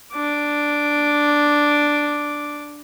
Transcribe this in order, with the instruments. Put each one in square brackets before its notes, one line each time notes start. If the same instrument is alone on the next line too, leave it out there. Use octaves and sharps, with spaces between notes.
[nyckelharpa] D4 D6